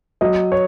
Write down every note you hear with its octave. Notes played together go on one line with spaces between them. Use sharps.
F#3 D#5
C#5